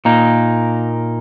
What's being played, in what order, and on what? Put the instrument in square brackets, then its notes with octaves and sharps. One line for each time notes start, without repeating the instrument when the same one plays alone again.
[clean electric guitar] A#2 A#3 D#4